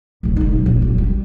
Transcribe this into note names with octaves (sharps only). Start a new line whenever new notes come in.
D1 C#3
D3 D#4
A#1 F#3
A#1 E2
F#2 C#3
G3